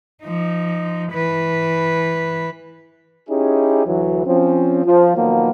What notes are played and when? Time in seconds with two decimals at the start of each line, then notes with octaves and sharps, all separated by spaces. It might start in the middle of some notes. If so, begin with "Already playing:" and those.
0.24 F3 D#4
1.11 E3 B4
3.28 C#4 D#4 E4 G4 G#4
3.86 D2 E3 F#3
4.26 F3 C4 C#4
4.84 F3
5.16 A#2 D#3 F3 F#3 A#3 B3